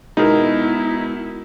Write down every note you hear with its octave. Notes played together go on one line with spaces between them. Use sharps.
B2 G#3 B3 D#4 E4 G#4 A#4